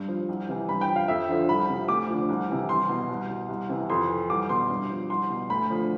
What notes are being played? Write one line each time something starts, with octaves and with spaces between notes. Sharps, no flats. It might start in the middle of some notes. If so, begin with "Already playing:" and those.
Already playing: G2
F3
C2
C3 E3
G2 B5
G5
F3
F5
F2 E5
D3 F3
C2 B5
C3 F3
D2 D6
D3 F3
C2
C3 E3
C2 C6
B2
C2
B2
C2
C3 E3
F2 C6
E3
C2 D6
B2 C6
G2
F3
C2 C6
B2
D2 B5
D3 F3